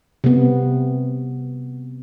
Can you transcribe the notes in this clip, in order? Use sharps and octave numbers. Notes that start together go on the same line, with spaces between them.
C3 B3